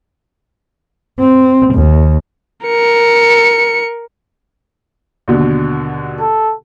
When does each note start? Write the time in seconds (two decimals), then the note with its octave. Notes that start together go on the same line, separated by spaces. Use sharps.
1.20 C4
1.75 D#2
2.66 A#4 C#7
5.28 D#2 B2 D3
6.21 A4